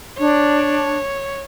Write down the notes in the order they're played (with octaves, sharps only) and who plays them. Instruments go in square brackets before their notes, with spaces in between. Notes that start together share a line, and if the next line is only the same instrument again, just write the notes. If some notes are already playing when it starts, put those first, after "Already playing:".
[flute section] D4 [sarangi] C#5